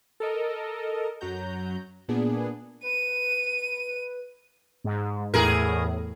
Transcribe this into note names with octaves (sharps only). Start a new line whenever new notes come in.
A4 A#4 D#5
F#2 F#3 F#4 A#5 G6
A#2 B3 D4 G#4
B4 D#7
G#2
E2 A2 G#4 A#4